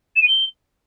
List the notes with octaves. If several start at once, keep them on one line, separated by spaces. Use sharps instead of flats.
E7
D#7
G7